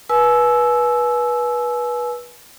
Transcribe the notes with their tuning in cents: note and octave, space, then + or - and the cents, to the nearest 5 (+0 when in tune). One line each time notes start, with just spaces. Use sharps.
B4 -25 G#5 +40 E6 +0